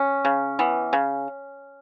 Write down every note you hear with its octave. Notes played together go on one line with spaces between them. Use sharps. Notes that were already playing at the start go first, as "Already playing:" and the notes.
Already playing: C#4
C#3
E3 B3
C#3